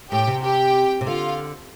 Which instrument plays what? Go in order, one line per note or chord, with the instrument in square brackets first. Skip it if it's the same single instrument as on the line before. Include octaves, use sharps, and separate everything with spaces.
[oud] A2 [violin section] G4 G5
[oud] C3
[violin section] G4 G5
[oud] C3
[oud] D3 [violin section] F4 F5